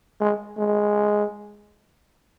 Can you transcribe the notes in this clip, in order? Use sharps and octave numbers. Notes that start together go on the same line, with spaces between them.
G#3
G#3